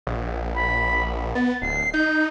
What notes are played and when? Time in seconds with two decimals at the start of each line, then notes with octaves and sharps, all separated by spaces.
0.07 A#1
0.55 B5
1.35 B3 A6
1.62 D1 C7
1.94 D#4 G6